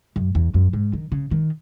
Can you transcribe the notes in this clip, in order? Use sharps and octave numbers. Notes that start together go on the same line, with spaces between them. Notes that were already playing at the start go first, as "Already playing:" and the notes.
F#2
E2
F#2
G#2
D#3
C#3
D#3